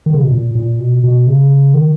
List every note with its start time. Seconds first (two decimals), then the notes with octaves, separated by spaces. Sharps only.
0.06 D#3
0.14 C#3
0.23 B2
0.31 A#2
0.55 A#2
0.79 B2
1.04 B2
1.27 C#3
1.74 D#3